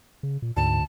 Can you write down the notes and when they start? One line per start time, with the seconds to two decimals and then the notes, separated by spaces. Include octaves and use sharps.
0.23 C#3
0.42 A#2
0.57 D2 G#2 A5